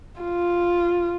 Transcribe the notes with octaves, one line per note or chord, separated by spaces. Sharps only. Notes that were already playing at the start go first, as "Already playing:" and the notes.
F4